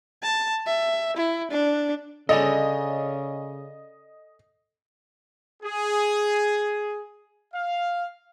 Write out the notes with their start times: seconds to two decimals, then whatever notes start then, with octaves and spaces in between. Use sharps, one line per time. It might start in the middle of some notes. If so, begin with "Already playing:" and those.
0.23 A5
0.67 E5
1.17 E4
1.52 D4
2.29 C#3 A4 D5 D#5 G#5
5.63 G#4
7.54 F5